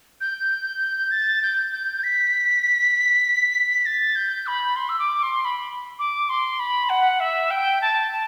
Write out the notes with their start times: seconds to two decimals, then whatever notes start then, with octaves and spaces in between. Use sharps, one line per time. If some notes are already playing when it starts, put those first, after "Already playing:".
0.21 G6
1.11 A6
1.42 G6
1.72 G6
2.03 B6
3.86 A6
4.16 G6
4.47 B5
4.76 C6
4.89 E6
4.99 D6
5.23 C6
5.45 B5
5.99 D6
6.29 C6
6.59 B5
6.89 F#5
7.20 E5
7.50 G5
7.81 A5
8.12 A5